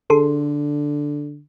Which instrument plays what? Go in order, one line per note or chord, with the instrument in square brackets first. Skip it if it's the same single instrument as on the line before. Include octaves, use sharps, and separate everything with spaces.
[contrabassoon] D3 [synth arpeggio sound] G#4 A4 C6